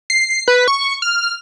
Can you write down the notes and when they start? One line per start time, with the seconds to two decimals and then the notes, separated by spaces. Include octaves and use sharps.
0.10 C7
0.48 B4
0.68 C#6
1.02 F6